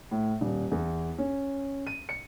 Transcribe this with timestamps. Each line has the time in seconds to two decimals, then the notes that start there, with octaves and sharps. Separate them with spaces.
0.11 A2
0.41 D#1
0.71 E2
1.18 C#4
1.87 D#7
2.09 C#7